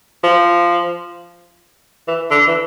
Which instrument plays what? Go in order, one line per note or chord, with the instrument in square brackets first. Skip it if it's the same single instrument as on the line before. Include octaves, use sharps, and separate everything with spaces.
[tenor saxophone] F3
E3
D3
E3